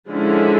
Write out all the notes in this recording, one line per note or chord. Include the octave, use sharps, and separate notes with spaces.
D3 F3 G#3 C#4 E4